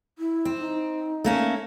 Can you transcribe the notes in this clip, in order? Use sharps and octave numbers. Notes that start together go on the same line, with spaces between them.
E4
C4
D#4
A3 A#3 C#4